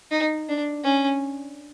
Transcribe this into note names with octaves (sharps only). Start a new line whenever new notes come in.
D#4
D4
C#4